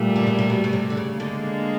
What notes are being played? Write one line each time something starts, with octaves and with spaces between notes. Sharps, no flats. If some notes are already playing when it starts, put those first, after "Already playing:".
Already playing: A#2 G3 A3
D3
C#3
C3
B2
B2
C3
D3
C#3
D3 G#3 A#3